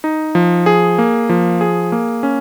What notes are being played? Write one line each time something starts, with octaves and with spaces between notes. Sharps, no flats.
D#4
F3
G#4
A#3
F3
G#4
A#3
C#4